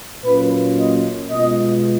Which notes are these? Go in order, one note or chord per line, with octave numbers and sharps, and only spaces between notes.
A#2 F#3 A#3 C#4 F4 B4
D#5
B2 G#3 B3 F4 D#5